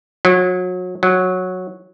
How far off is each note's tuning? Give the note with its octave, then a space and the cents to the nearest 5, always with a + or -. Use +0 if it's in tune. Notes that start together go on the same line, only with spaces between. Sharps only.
F#3 -30
F#3 -10